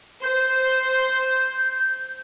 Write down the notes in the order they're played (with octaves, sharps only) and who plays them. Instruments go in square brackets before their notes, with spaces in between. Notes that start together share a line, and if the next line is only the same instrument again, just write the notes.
[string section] C5 [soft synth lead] G6